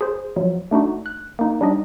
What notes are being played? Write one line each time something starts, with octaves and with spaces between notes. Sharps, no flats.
G#4 C5
F3 F#3
A3 D4 D#4 F#4
F#6
A#3 D#4
G3 D4 D#4 D#5